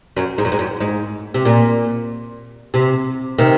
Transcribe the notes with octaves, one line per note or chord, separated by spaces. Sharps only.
F#2
G#2
F#2
G#2
F#2
G#2
C3
A#2
C3
C3 D#3